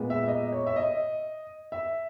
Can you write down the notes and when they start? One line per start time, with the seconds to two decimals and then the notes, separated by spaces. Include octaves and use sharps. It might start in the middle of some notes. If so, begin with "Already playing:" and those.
Already playing: A#2 G#3 B3
0.10 E5
0.28 D#5
0.52 C#5
0.67 E5
0.76 D#5
1.72 E5